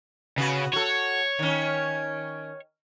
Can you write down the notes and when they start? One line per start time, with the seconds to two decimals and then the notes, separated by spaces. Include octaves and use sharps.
0.38 C#3 B3 F#4
0.73 F#4 A4 C#5
1.39 D#3 C#4